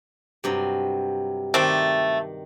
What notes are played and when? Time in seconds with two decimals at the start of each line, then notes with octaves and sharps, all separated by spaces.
0.44 G2 C3 F#3
1.54 D#3 A3 C4 D5